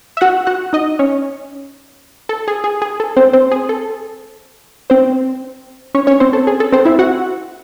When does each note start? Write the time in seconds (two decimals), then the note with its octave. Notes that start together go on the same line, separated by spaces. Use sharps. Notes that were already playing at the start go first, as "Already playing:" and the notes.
0.17 E5
0.21 F#4 F#5
0.47 F#4 F#5
0.73 D#4 D#5
0.99 C#4 C#5
2.29 A4
2.48 G#4
2.64 G#4
2.82 G#4
3.00 A4
3.17 C4 C5
3.33 C4 C5
3.51 G#4
3.69 A4
4.90 C4 C5
5.95 C#4 C#5
6.07 C#4 C#5
6.20 C4 C5
6.33 A4
6.47 G#4
6.60 A4
6.72 C4 C5
6.85 E4 E5
6.99 F#4 F#5